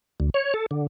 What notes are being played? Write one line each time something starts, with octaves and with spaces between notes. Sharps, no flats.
D2
C#5
A4
D3